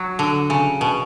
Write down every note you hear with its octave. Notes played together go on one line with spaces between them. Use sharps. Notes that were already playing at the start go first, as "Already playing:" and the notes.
Already playing: F#3
D3
C#3
B2